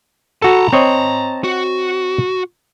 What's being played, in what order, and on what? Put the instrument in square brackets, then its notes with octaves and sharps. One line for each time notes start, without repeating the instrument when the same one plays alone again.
[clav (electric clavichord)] F#4 A4 [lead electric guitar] A5 A#5
[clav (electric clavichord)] C4 C#5 D#5
[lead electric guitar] F#4